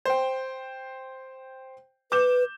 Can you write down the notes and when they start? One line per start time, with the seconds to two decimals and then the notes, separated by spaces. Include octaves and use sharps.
0.05 C5 G5
2.12 B4 D6 G6 E7